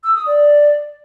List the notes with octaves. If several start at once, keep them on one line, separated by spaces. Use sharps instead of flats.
E6
D#6
D5